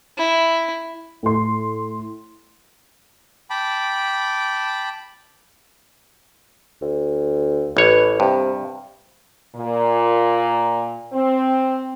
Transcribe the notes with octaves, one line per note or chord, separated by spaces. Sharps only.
E4
A2 C6
G5 A5 B5 D6
D2
A1 B4 C#5
G2 C3
A#2
C4